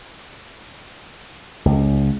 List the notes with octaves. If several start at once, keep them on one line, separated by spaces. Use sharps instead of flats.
C#2